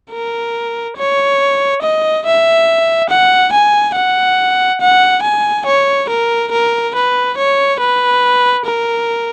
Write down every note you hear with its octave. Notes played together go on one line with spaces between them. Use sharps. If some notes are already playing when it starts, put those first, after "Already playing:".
A#4
C#5
D#5
E5
F#5
G#5
F#5
F#5
G#5
C#5
A#4
A#4
B4
C#5
B4
A#4